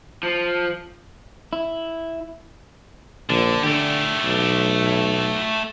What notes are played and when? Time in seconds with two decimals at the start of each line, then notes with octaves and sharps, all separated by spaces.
0.23 F3
1.53 E4
3.30 A#1 D3
3.64 D3 A3 G4
4.24 B1